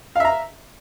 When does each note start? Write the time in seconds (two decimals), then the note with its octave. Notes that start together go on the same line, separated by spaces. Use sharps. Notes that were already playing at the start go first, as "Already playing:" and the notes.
0.16 F5
0.20 E5
0.25 A#5